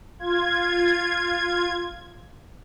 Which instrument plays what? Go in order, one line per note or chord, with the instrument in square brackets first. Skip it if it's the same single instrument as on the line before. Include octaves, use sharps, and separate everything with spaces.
[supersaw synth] F4 G#6